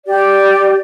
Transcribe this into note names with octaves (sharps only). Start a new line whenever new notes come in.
G4 D5